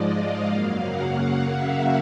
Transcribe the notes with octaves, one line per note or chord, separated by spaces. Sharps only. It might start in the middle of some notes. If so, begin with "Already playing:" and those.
Already playing: G#2 F3 G#3 D5 D#5
F5
F#2 C#3 F#3 A#3 F5
F#5
F5
E5